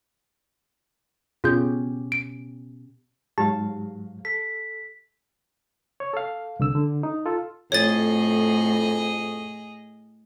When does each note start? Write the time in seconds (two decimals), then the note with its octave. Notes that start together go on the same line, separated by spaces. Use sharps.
1.44 B2 C#4 F4 G4 G#4 G6
2.12 D7
3.38 G#2 F#3 G4 F5 A5
4.25 A4 B6
6.00 C#5
6.13 A4 F5
6.60 C2 D3 E6
6.75 D3
7.03 D#4
7.26 F4 A4
7.72 F2 A2 G#4 C#5 D#5 A6